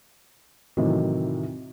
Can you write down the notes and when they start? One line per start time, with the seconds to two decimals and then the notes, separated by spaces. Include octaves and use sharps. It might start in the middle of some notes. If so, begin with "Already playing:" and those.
0.77 A2 C3 D#3 E3 F#3